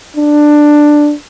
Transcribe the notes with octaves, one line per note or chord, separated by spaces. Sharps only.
D4